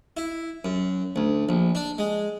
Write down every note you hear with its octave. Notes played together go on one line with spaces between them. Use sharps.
E4
F#2
D2
A#1
D4
G#3